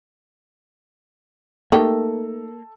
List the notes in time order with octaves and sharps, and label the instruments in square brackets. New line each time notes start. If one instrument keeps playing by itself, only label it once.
[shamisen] A3 D#4 G4 [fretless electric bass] A#3 [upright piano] A4